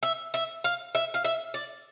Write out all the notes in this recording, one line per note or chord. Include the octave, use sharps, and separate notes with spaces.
E5
E5
F5
E5
F5
E5
D5